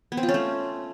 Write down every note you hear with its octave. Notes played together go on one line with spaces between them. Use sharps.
B3
C4
F4
C#4
A3